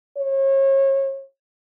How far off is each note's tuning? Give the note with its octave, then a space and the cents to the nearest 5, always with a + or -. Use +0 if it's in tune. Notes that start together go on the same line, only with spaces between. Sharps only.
C#5 -35